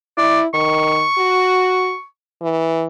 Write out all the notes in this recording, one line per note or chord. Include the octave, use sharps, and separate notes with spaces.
E4 D5
D#3 C#6
F#4
E3